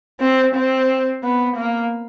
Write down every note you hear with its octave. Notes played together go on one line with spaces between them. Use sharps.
C4
C4
B3
A#3